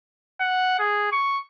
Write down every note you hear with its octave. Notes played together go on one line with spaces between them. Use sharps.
F#5
G#4
C#6